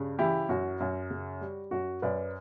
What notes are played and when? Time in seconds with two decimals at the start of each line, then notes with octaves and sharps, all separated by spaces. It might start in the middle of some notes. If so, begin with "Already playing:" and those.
Already playing: G2 C#3
0.19 E3 E4 G4
0.49 F#2 F#4
0.80 F#2
1.10 C#3
1.41 G3
1.71 F#2 F#4
2.02 F#2 B4 D5